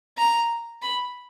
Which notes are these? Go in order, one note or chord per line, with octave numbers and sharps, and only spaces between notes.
A#5
B5